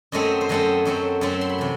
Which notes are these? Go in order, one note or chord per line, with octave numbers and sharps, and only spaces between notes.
F#2 F#3 A3 C4 D#5
C5
F#2 F#3 A3 C4 D#5
F#2 F#3 A3 C4
F#2 F#3 A3 C4 A5
C6
B5
C3 E3